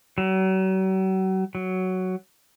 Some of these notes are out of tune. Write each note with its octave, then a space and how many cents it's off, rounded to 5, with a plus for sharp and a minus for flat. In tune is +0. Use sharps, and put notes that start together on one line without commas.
F#3 +40
F#3 +5